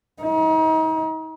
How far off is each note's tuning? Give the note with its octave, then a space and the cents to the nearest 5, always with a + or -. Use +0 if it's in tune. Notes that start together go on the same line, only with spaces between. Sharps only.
D#4 +35